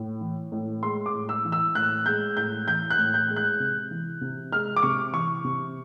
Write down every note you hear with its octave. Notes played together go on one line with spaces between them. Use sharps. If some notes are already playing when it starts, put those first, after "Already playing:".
Already playing: A2
E3
A2
G#3 C6
D6
A2
E6
E3
E6
A2 F#6
G#3 G6
A2 G6
E3 G6
F#6
A2
G6
G#3
F#6
C3
E3
C3
G#3 F6
D6
C3 C#6
E3 C#6
C3